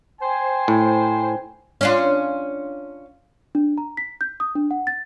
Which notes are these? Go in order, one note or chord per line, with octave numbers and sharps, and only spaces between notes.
C5 G5 G#5
A2
C#4 D4 F4
D4
A#5
B6
G6
D#6
D4
F#5
A6